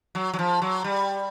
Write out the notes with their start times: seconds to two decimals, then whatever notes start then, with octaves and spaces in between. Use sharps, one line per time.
0.15 F#3
0.33 F#3
0.39 F3
0.62 F#3
0.84 G3